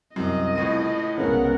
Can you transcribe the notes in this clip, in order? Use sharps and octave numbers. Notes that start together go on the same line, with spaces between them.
C2 F#2 D#5
C#2 A2 D#7
C2 C#3 G#3 B3 A#4 F#5